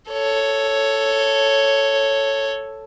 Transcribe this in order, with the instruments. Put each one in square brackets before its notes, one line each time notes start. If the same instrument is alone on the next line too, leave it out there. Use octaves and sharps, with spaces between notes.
[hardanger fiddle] A4 C#5